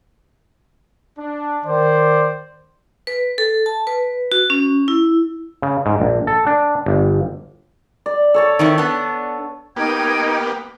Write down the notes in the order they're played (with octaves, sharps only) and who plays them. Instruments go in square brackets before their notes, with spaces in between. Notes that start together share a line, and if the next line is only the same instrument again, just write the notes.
[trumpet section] D4
[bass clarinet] D#3 [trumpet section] C5 D5
[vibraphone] B4
A4
A5
B4
F#4
C#4
E4
[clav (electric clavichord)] C#3
G#2
A#1
A4
D4
G1
[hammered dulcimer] D5
A4 C#5 A5
[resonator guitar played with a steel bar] D#3 C4 E4
B3 D4
[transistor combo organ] A#3 B3 G4 [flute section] D#4 G5 G#6